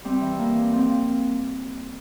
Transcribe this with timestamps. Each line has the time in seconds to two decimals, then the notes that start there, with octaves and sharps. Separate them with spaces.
0.05 G3 C4
0.21 E3
0.39 E3 A#3
0.56 G3
0.73 F3 C4
0.90 F3